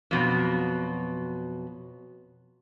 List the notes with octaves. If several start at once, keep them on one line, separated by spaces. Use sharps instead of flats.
F2 B2 F#3